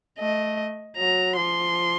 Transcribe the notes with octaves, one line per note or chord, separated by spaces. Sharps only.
A3 D#5
F#3 A#5
F3 C6